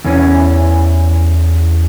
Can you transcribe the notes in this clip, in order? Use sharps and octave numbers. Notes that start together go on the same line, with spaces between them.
E2 E3 C#4